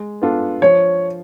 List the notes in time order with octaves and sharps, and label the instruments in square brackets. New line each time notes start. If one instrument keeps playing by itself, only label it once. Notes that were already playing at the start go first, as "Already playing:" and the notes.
Already playing: [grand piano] G#3
B3 D4 F4 A4
[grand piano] F3 [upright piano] C#5